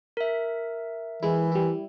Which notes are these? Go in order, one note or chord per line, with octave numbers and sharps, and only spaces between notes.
A#4 E5
E3 G#3 E4
G3 E4